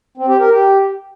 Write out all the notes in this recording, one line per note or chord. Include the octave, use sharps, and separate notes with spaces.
C4
G4
A#4
G4